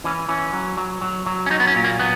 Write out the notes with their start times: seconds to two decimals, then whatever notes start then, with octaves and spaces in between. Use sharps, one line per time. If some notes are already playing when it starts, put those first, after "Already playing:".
0.04 E3 C#4
0.29 E3 C#4
0.53 F#3
0.77 F#3
1.01 F#3
1.26 F#3
1.46 C#4
1.50 F#3 D#4
1.60 B3
1.67 C#4
1.76 A#2
1.84 A#3
1.99 F#3 B3